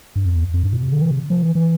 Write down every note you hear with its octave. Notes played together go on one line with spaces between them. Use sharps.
G2
F2
E2
F2
G2
B2
C3
D3
E3
C3
F3
E3
E3